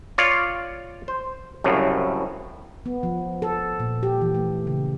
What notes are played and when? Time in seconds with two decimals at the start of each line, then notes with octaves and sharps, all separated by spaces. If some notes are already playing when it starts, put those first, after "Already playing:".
0.18 F4 C#5 D5
1.08 C5
1.64 C2 F#2 A2 C#3
2.86 B3
3.03 F3
3.42 A4
3.80 A#2
4.03 G4
4.21 E3
4.35 A3
4.67 C#3